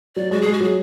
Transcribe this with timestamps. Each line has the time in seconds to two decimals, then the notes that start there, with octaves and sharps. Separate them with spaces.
0.16 F#3 D5
0.31 G#3 F#4
0.42 G#3 G#4
0.53 F#4
0.61 F#3 G#4